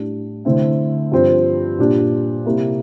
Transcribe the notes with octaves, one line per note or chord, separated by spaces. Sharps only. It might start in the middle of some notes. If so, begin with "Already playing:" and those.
Already playing: A2 G3 D4
D3 A3 C4 E4
G2 F3 C4
A#2 G3 D4
C3 G3 A#3 E4